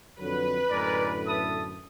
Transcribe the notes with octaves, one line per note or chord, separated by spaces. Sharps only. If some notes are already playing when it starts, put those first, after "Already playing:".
F2 D3 F#3 B4
F#2 A2 D3 G#3 A#4 D5
E5 A5 D#6